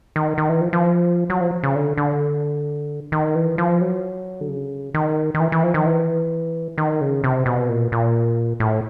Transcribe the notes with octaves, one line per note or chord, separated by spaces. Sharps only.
D#3
D#3
E3
F3
F3
F#3
F3
C#3
D3
D3
D#3
E3
F3
F#3
D3
C#3
D#3
D#3
E3
E3
F3
D#3
E3
D#3
C#3
C3
B2
A#2
A#2
A2